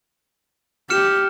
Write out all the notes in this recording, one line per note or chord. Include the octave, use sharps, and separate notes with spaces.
G4 F6 C#7 E7